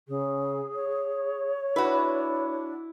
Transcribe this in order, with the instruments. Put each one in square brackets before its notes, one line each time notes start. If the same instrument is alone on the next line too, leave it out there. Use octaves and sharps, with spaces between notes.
[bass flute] C#3 [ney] G#4
[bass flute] C#5
[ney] D4 [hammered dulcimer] E4 [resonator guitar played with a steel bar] F#4 B4